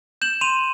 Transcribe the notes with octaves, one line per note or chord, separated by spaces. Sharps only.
G6 E7 F#7
C6 D#7 F7